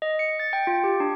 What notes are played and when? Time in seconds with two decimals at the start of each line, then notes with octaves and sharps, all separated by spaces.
0.02 D#5
0.19 C#7
0.40 A6
0.53 G5
0.67 F4
0.84 G4
1.00 D4